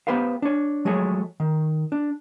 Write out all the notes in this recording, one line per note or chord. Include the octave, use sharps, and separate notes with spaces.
B3 G4 B4 C5 F5
D4 C#5
F3 F#3 G#3 A3 G#4 C#5
D#3
D4